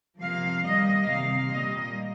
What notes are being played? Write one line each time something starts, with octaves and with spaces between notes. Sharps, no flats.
C3 F3 A#3 F5
D#3 G3 A#3 D#5
C3 D#3 A#3 F5
A#2 G3 A#3 D#5